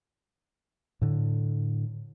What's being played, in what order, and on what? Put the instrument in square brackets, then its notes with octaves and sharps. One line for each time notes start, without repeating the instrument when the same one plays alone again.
[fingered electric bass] A2 D3